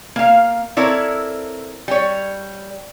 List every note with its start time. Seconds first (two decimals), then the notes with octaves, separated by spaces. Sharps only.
0.16 A#3 F5
0.77 C4 E4 A4 A#4 C#5 D5
1.88 G3 C#5